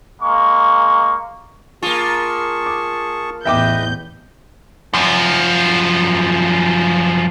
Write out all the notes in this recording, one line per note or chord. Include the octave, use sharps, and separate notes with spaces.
G#3 A#3 C#6
A#3 F4 G#4 A5 C#6
D6
A1 E2 B4 D#5 E5 G5 D6 G6
F#2 F3